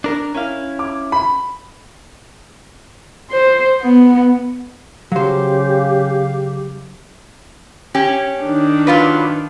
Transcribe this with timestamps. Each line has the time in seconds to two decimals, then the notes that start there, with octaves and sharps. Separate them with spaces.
0.04 D4 A#4
0.35 C#4 E4 F5
0.79 D6
1.12 B5
3.31 C5
3.81 B3
5.12 C#3 F#3 G4 C5 F5
7.95 C#4 G4
8.42 D#3 D4
8.87 F#3 F4 B4